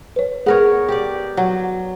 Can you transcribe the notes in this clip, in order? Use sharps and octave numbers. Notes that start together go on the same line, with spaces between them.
B4 C#5
B3 G#4 A#4 C#5
G4 D5
F#3